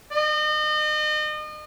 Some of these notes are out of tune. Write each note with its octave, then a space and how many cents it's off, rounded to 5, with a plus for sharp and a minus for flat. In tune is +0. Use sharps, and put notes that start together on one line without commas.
D#5 -35